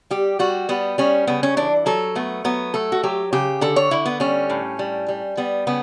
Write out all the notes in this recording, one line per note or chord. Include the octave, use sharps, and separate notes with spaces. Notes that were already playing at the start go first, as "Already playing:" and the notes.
G3 G4
G3 F#4
G3 B3
G3 C#4
C#3 B3
C#4
E3 D4
F#3 A4
A3 B3
F#3 B3
A3 A4
F#4
F#3 G4
C#3 G4
D3 A4
C#5
D3 E4
B3
G3 C#4
A2
G3
G3
G3 B3
C#3 B3